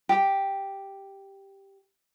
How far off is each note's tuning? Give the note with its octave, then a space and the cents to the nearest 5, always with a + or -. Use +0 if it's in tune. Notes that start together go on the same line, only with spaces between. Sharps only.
G4 +0